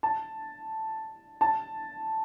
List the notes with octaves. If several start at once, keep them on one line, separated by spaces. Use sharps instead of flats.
A5
A5